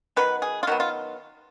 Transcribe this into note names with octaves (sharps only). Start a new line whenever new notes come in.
D#3 F#3 B3 B4
G#4
F4
D#3 F#3 B3 F#4
F4